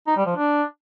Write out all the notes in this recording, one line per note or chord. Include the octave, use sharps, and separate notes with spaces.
D#4
G3
F3
D4